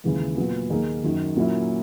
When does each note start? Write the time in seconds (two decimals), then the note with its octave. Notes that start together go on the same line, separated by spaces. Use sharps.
0.04 D#2 C#3 E3 G#3
0.37 A#2 F#3 B3
0.70 D#2 D#3 A#3 D#4 G#4
1.03 F#2 D#3 F#3
1.36 A#2 F#3 A#3 C#4 E4